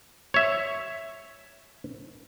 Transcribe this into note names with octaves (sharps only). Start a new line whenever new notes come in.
C#5 E5